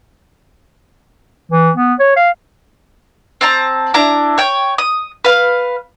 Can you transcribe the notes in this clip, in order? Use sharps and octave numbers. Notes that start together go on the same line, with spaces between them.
E3
B3
C#5
F5
C4 A5 A#5
D4 E4 A#5
C#5 G5
D#6
B4 F5